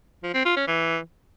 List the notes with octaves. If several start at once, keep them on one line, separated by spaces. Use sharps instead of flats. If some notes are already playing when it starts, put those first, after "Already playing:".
F3
C4
F4
C#4
E3